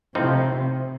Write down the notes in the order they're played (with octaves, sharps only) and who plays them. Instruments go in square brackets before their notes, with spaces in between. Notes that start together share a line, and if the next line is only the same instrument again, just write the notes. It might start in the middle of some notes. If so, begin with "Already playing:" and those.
[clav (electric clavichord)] A2 F3 C4 D#4 [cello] C3